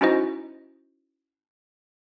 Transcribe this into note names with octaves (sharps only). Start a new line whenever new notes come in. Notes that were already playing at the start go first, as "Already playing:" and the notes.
C#4 D#4 E4 F#4 C5 D#5